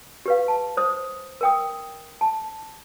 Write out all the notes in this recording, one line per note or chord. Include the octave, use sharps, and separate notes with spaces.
G4 B4 F5
A5
C5 D#6
A#4 G5 D#6
A5